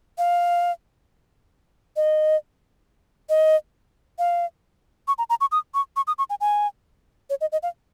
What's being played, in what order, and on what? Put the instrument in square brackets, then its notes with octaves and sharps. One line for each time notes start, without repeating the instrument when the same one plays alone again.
[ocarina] F5
D#5
D#5
F5
C#6
A#5
A#5
C#6
D#6
C#6
C#6
D#6
C#6
G#5
G#5
C#5
D#5
D#5
F5